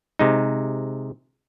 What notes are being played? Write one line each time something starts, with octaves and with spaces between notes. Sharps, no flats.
C3 G#3 D#4